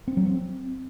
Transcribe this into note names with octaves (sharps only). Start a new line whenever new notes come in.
C4
F#3
C4